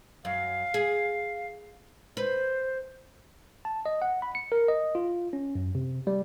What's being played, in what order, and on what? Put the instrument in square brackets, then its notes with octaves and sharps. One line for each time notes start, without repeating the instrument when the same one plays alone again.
[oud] F#2 [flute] F5
[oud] G#4
[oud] B4 [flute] C5
[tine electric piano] A5
D#5
F#5
B5
C#7
A#4
D#5
F4
C#4
F#2
C3
G3